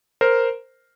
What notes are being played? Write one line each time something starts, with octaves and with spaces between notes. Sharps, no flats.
A#4 C5